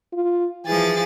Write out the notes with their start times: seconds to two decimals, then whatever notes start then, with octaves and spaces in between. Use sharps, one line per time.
0.12 F4
0.66 E3 F3 G#4 A6